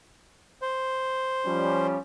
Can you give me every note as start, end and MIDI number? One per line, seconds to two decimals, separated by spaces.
0.62 1.87 72
1.45 1.97 53
1.45 1.97 55
1.45 1.97 61